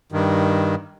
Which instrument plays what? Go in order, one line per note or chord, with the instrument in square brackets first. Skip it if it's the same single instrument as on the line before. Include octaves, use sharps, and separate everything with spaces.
[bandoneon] G2 D#3